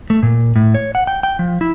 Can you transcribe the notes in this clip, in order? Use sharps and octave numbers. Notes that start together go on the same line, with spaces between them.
A3
A#2
A2
C#5
F#5
G5
G5
F3
E4